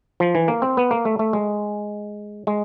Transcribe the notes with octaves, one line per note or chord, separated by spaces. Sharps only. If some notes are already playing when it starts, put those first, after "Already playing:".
F3
E3
A#3
C4
B3
A#3
A3
A3
G#3
G#3